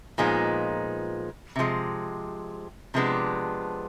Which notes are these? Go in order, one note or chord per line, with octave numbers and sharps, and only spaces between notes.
A#2 F3 G#3 B3 D#4
C3 F3 G#3
C3 F3 G#3 B3 D4